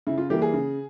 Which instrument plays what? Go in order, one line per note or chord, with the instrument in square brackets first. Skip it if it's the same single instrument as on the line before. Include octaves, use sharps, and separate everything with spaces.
[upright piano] C#3 E4
F4
E3 G3 A#3 G4
G#4
C#3